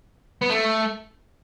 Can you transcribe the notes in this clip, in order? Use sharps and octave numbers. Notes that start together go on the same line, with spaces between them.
B3
A3